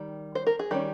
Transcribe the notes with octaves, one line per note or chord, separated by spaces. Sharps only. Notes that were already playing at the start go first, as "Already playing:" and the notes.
Already playing: D#3 G3
C5
A#4
G#4
D#3 G3 C#4 G4